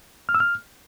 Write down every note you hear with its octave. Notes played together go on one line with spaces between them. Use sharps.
F6
E6
F6